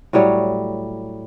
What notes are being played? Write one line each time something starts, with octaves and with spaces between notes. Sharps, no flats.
A2 F#3 G3 C#5